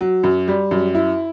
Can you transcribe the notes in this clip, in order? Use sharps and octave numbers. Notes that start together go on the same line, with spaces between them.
F#3
F#2
G3
F#2
E4